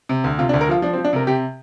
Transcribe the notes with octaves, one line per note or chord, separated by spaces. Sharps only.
C3
D2
C3 F4
D4
D2
A#4
F3 F4
F3 D4
C4
F3
D4
C3 A#4
C3 G4